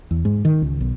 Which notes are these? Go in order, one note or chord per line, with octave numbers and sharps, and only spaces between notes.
E2
G#2
D#3
C#2
B1